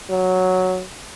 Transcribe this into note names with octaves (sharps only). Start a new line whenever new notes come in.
F#3